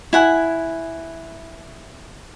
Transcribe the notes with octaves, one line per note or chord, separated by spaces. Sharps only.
E4 F#5 G#5